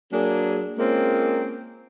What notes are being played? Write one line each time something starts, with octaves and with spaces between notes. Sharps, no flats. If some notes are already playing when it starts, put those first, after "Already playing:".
F#3 A#3 D4 G#4
G#3 A#3 C4 C#4 F4